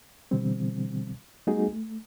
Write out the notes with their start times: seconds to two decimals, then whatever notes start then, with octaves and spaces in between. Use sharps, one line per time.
0.31 B2 D3 E3 G3 C4
1.47 G3 A3 B3 D#4 F#4 G#4
1.73 A3